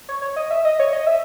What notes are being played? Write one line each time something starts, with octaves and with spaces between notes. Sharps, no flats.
C#5
C#5
D#5
E5
D#5
C#5
D#5
E5